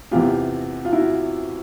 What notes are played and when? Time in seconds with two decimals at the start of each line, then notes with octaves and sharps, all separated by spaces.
0.11 E2 C3 E3 F4 G4
0.85 F4
0.93 E4 F#4